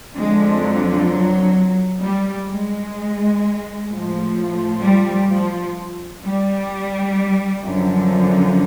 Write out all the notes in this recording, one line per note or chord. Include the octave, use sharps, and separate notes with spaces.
F2 D3 F3 G#3
F#3
F#3
G3
G#3
A2 F3
G3
F3
G3
F#2 D3 F3